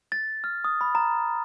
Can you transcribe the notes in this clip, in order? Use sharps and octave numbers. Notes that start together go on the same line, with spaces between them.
A6
F6
D#6
B5
A#5